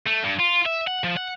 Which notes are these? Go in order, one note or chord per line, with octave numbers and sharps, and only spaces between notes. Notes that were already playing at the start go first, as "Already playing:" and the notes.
A3
G2
F4
E5
F#5
F3
F#5